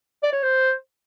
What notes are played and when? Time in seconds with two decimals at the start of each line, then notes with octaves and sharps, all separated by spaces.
0.23 D5
0.33 C#5
0.43 C5